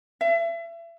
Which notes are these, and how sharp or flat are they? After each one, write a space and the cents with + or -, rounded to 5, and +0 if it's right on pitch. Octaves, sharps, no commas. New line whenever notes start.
E5 +35